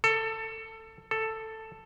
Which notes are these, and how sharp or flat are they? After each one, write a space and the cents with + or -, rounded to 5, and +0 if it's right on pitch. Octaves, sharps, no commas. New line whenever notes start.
A4 +15
A4 +5